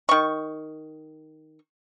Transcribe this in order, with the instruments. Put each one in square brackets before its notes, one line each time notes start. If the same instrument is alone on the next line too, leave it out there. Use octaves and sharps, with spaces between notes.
[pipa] D#3 C#6